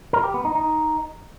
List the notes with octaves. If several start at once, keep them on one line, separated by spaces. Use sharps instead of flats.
A#4
G4
B3
D#4
D#4